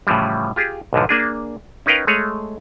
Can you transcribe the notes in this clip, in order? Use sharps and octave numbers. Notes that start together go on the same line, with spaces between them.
A2 C#3 E3 F3 G3
F4 G4 G#4
B1 G#2 D3 F3
A#3 D4 G#4
C#4 D#4 A#4 B4 F5 G5
G#3 A3 G#4 C#5